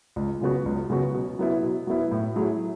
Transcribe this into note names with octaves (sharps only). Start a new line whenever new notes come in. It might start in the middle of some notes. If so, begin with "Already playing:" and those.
C#2
C#3 F#3 B3 F#4
C#2
C#3 F#3 B3 F#4
B2
F#3 B3 E4
B2
F#3 B3 E4
A2
F#3 A3 E4 G#4